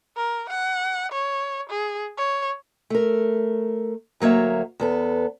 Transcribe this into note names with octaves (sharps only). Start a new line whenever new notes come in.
A#4
F#5
C#5
G#4
C#5
A3 A#4
D2 F#3 A#3 C#5 E5
E2 B3 A4